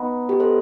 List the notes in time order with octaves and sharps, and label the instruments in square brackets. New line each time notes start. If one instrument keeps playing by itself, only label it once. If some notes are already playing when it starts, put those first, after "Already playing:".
Already playing: [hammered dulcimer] B3 D#4
[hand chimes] G4
A4 C5